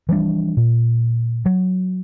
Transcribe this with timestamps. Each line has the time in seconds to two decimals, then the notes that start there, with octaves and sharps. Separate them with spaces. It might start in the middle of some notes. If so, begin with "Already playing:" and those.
0.09 E3 F3 G3 D4
0.57 A#2
1.46 F#3